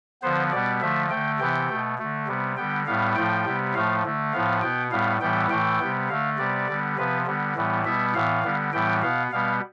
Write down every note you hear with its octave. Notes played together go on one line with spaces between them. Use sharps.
D3 F3 B3 C5
B2 G3 B3 D5
D3 F3 A3 E5
D3 A3 G5
C3 E3 B3 G5
B2 A3
D3 A3
C3 G3 B3
D3 G3 B3 G5
A2 G3 B3 F5
A2 F3 A3 G5
C3 G3 B3
A2 F3 A3 F5
D3 A3
A2 F3 B3 F5
B2 B3 G5
A2 G3 B3 F5
A2 E3 G3 B3 G5
A2 E3 A3 G5
C3 G3 B3
D3 A3 F5
C3 G3 B3 D5
D3 G3 B3
C3 F3 B3 B4
D3 G3 B3
A2 E3 G3 B3
B2 G3 B3 E5
A2 E3 B3 F5
D3 G3 B3
A2 E3 G3 B3 G5
B2 B3 F5
B2 G3 B3 F5